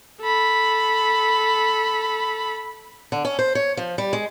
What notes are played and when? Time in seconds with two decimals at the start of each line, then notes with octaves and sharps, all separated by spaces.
0.22 A4 B5
3.12 D3
3.25 C#4
3.39 C5
3.55 C#5
3.77 F3
3.98 G3
4.13 G#3